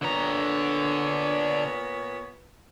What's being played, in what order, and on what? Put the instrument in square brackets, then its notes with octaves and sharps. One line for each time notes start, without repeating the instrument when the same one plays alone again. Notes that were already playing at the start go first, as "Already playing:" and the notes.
[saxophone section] A#2 B3 C#5 [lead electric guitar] D3 A#5